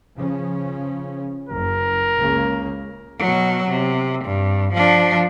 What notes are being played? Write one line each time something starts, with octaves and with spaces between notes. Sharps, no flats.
C#3 F3 C#4
F#1 A#4
C#2 C#3 A#3
B2 F#3
C3
G2
F3 D4